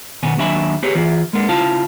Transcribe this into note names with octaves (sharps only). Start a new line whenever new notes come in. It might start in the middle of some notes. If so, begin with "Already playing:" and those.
B2 D#3 B3 G#5
D#2 F#3 D4 E5 G#5 B5
B3 G4 G#4 B4 C#5
E3 F4 G#4
G#3 A#3 B3 D4
C#3 E4 F4 F5 A5